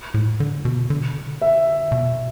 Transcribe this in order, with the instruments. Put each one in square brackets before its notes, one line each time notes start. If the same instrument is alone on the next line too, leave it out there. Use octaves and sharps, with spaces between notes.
[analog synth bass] A2
D3
B2
D3
[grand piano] E5
[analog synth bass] B2